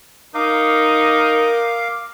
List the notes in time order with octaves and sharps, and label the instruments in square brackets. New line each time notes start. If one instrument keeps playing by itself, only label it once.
[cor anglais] D#4 [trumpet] A#4 [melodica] F5 D6